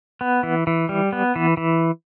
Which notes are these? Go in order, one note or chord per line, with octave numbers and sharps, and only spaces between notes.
B3
E3
E3
G3
B3
E3
E3